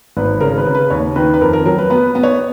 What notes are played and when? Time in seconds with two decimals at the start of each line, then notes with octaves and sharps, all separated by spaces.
0.17 G#1 B4
0.40 C#3 A#4
0.58 B4
0.67 C#3
0.75 B4
0.90 D#2 C#5
1.16 D#3 B4
1.34 B4
1.41 F2 A#4
1.53 A#4
1.66 F#3 A#4
1.78 B4
1.90 B3 B4
2.15 B3
2.23 C#5